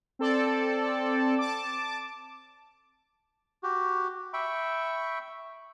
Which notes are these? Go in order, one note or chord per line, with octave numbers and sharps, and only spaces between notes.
C4 A4 D5 A5
A5 D6
F#4 G4
E5 G5 B5 C#6